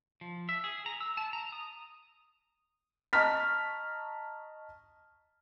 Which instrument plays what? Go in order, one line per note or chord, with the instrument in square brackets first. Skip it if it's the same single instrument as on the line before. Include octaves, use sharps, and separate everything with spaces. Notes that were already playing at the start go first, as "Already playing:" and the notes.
[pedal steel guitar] F3
E5
G#4
A#5
E6
A5
A#5
D#6
[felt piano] D#5 A5 A#5 C#6 F6 B6